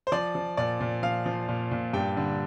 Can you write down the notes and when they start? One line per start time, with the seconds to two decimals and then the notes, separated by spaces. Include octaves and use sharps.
0.07 C5
0.12 F3 D5
0.35 F3
0.57 A#2 D5
0.81 A#2
1.03 F3 F5
1.26 F3
1.48 A#2
1.71 A#2
1.93 G2 G5
2.17 D3